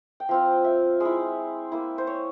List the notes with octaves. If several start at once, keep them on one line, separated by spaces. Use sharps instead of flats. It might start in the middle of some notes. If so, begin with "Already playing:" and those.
G5
F3 C4 F4 F5
E5
G#3 E4
A#3 E4
C5
C#5